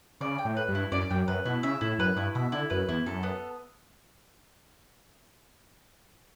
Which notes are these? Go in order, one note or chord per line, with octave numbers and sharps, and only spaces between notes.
C#3 D5
G5
A2
B4
G2
E4
F#2 D5
F#2 G5
F#2 B4
B2 E4
C#3 E5
A2 E4
F#2 B4
G2 E4
B2 E5
D3 E4
F#2 B4
E2 E4
F#2 A4
B3